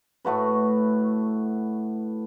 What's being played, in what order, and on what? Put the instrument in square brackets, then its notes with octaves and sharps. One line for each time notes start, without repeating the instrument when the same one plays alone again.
[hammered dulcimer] A2 A3 F#4 B4